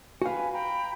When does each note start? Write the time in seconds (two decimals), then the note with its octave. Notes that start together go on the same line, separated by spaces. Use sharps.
0.22 F#4 B4 F5 G5 G#5
0.52 G5 A#5 B5